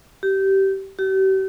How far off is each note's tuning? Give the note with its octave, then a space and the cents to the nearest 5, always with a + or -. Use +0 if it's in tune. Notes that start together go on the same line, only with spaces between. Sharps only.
G4 -20
G4 -40